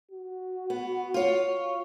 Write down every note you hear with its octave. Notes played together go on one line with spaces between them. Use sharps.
F#4
B3
F4 C#5